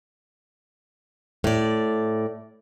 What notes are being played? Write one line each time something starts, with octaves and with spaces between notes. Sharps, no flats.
A2 D5